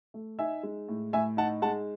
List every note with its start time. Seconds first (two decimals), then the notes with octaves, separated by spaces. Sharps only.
0.14 A3
0.39 D#4 E5 G#5
0.63 G#3
0.88 A2
1.13 A2 E5 G#5
1.37 D#4 F#5 A5
1.62 G#3 F#5 A5